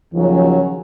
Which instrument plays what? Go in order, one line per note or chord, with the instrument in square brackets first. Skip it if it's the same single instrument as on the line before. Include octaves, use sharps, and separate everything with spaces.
[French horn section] D#2 C#3 F#3 C#4 [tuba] F3